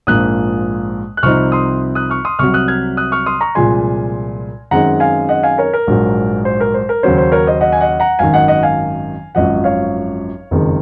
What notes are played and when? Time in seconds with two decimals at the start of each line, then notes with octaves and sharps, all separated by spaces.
0.07 A#1 G#2 F3 A#3 D#6 F#6
1.17 F#6
1.23 C2 C3 F3 C4 D#4 C#6 F6
1.52 C6 D#6
1.95 D#6 F#6
2.10 C#6 F6
2.25 C6 D#6
2.39 C2 C3 F#3 C#6 F6
2.54 D#6 F#6
2.68 F6 G#6
2.97 D#6 F#6
3.12 C#6 F6
3.26 C6 D#6
3.41 A#5 C#6
3.55 C2 A#2 F3 G#3 G#5 C6
4.71 F#2 D#3 G#3 C4 D#4 F#5 A#5
5.00 F5 G#5
5.29 D#5 F#5
5.43 F5 G#5
5.58 A#4 C#5
5.73 A#4
5.87 A#1 G#2 F#3
6.45 C5
6.60 A#4
6.74 C5
6.89 A#4
7.03 D#2 C#3 F#3 C#4 C5
7.18 C5
7.32 A#4 C#5
7.46 C5 D#5
7.61 D#5 F#5
7.73 G#5
7.81 D#5 F#5
8.00 F#5 A#5
8.19 G#1 F#2 D#3 F5 G#5
8.34 D#5 F#5
8.48 D#5 F#5
8.63 F5 G#5
9.35 G#1 F#2 F3 D#5 F#5
9.64 C#5 F5
10.51 F#1 F2 D#3 G#3